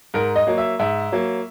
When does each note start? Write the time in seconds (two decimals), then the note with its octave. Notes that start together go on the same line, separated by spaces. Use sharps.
0.14 G#2 A#4
0.36 D#5
0.47 F#3 A#3
0.58 E5
0.79 G#2 E5
1.12 F#3 A#3